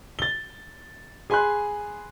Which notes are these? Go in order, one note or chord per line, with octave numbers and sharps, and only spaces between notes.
A6 G7
G#4 G#5 B5 C6 F#6